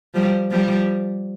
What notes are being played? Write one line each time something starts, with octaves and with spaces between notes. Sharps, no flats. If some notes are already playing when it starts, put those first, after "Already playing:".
F3 G3
F3 G3